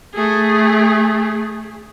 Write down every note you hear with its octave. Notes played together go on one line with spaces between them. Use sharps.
A3 G#4